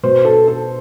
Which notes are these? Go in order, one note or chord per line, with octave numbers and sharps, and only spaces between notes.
B2 C5
A4
A4